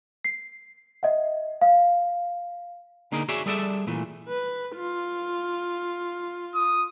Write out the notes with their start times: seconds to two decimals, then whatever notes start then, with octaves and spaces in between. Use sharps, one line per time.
0.25 C7
1.03 D#5 E5 F#5
1.61 F5
3.12 D3 A#3 D#4 G#4 A#4
3.29 F#4 G#4 C#5 D5 E5
3.46 G3 G#4 A4 D5 E5
3.87 A#2 E3 A3
4.29 B4
4.76 F4
6.55 D#6